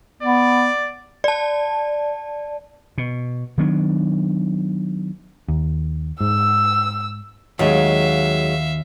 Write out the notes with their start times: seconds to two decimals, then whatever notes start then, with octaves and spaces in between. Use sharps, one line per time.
0.23 B3 D5
1.24 D5 A5
2.98 B2
3.58 D#3 F#3 B3 D4
5.48 D#2
6.21 G#2 E6
7.59 D#2 F#3 G#3 D#4 E5 F5